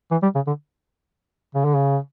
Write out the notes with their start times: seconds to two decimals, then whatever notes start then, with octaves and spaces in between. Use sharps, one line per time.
0.11 E3
0.23 G3
0.35 C#3
0.47 D3
1.55 C#3
1.65 D3
1.75 C#3